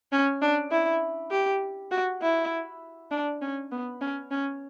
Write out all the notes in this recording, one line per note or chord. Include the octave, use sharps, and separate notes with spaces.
C#4
D4
E4
G4
F#4
E4
D4
C#4
B3
C#4
C#4